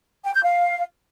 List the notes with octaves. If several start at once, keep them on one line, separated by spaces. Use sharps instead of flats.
G5
G6
F5